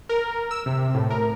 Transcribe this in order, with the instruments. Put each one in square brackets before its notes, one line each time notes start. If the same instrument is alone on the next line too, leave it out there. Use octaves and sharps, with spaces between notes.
[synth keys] A#4
E6
C3
A2
A#4